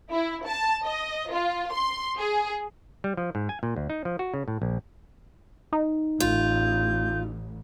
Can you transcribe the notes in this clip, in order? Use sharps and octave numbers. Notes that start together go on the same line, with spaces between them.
E4
A5
D#5
F4
C6
G#4
G3
F3
G#2
G#5
A#2
D2
D#4
F3
F#4
C#3
A2
A#1
D#4
A1 F4 G6